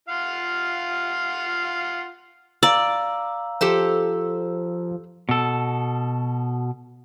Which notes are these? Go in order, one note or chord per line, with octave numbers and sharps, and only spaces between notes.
F4 F5 F#5
D5 F5 A#5 E6
F3 G4 A4 C5
B2 A4